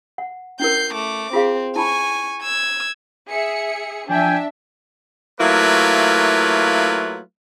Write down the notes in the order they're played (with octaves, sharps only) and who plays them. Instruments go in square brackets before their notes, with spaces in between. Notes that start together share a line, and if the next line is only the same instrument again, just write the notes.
[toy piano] F#5
[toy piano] C#4 E4 A#4 [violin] G6 C7
[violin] A3 D6
[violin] C4 [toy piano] F4 G#4 F5
[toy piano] E4 A5 B5 [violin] G#5 C#6
[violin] E6 G#6
[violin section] G#4 E5 C#7
[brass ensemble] F3 G5 G#5 [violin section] D4 E5
[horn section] F#3 A3 A#3 E4 F4 B4